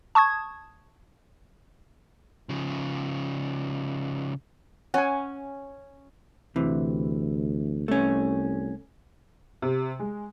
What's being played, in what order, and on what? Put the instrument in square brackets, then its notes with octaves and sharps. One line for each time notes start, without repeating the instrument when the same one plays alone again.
[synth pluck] A5 C#6 D#6 G#6
[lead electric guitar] C#3 F3
[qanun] C#4 [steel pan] F#5 G#5
[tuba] D2 [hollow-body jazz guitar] C3 E3
[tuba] C2 [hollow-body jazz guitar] A3 C#4
[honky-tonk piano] C3
G#3